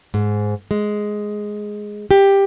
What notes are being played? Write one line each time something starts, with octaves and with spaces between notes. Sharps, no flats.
G#2
G#3
G4